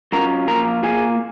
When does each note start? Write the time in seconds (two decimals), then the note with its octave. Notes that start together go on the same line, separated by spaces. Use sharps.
0.12 F#3 C#4 F4 A#4 A#5
0.48 F3 A#3 F4 A#4 A#5
0.83 A#2 F3 A#3 F4 G#4 G#5